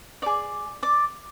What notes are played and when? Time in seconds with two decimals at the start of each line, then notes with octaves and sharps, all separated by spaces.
0.22 G#4 C#5 D5 D6
0.83 D5 D6